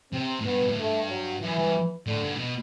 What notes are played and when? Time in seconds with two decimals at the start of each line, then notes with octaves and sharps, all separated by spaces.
0.12 C3 C4
0.40 A2
0.44 G2 B3
0.59 B2
0.68 A2
0.77 G2 A3
1.09 F#3
1.41 F#2 E3
1.58 G2
2.07 A2 D3
2.22 G2
2.34 A2
2.38 B2